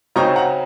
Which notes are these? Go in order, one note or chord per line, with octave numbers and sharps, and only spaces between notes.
C#3 F#3 C4 D#4 A#5 C#6
F#5 A#5